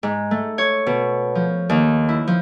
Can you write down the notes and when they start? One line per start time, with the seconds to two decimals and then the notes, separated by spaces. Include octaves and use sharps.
0.03 G#2
0.31 A3
0.58 C#5
0.87 B2
1.35 F3
1.69 D#2
2.09 E4
2.27 F3